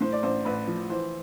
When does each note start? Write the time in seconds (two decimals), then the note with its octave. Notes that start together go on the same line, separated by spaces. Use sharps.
0.01 A2 C5
0.12 D5
0.23 A1 C5
0.45 A1 B4
0.67 F3
0.89 E3 C5